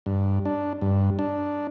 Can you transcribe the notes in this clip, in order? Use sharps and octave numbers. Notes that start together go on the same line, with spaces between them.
G2
D4
G2
D4